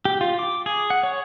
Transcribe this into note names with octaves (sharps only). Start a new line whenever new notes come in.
G4
F4
D6
G#4
F#5
C#5